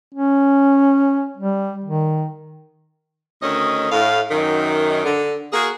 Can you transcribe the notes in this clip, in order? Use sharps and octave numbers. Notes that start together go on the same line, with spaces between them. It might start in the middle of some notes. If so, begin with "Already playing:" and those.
C#4
G3
D#3
D2 D#3 C#4 D#5
A2 F5
F#2 D#3
D3
A#3 F#4 G#4